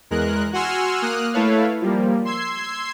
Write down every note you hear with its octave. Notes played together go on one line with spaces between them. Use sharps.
E2 G#3 A#4 F#6
F#4 F#5 G#5 C6 E6 F6
A#3 D#6 F6 F#6
A3 E4 A4 B4 C#5 F5
F3 G3 A#3
C6 E6 G#6 C7